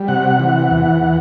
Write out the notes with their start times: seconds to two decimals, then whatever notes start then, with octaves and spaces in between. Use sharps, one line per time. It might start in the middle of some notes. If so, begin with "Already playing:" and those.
Already playing: G3
0.08 C3 F#5
0.39 E3
0.71 E2
1.02 E3